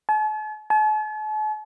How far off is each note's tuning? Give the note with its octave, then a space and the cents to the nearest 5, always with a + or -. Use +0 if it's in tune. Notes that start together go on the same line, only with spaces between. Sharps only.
A5 -45
A5 -45